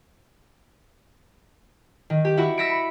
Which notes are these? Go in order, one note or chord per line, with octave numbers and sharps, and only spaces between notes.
D#3
G4
E4 F#4
E6 A#6 B6 C#7 D7
B5